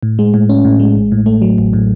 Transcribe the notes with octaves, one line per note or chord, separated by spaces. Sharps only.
A2
G#3
A2
C#4
A2
G#3
A1
A2
A3
F#3
A1
A2